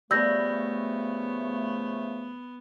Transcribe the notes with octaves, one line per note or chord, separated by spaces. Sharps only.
C#3 F3 G3 A3 B3 E6 G6 A#6